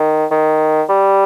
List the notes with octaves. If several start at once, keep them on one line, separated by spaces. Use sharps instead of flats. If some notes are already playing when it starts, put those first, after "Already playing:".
Already playing: D#3
D#3
G3